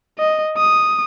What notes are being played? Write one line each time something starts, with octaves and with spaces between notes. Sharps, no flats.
D#5
D#6